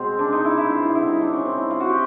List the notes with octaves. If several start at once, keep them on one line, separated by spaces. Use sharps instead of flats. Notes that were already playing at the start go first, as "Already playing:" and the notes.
Already playing: B2 G#3 C4
D4
D#4
E4
E4
F4
E4
D3 G3 E4
D#4
D4
C#4
C4
E4
F4
F#4
G4